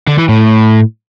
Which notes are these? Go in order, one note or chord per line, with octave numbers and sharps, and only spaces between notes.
D3
E3
A2